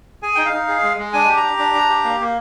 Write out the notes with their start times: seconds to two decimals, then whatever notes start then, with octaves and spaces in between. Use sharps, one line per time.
0.23 G#4 G#5
0.35 D#4 G5
0.45 F5
0.53 D#4
0.68 G#4
0.83 G#3
0.98 G#3
1.13 D4 G#5
1.29 G4
1.37 A#5
1.43 G4
1.59 D4
1.74 D4
1.89 G4
2.04 A#3
2.20 A#3